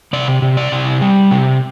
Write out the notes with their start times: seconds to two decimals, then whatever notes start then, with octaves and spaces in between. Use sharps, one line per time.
0.13 C3 D5
0.42 C3
0.57 D5
0.72 C3
1.01 G3
1.31 C3